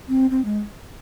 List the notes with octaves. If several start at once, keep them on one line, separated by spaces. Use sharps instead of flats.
C4
C4
G#3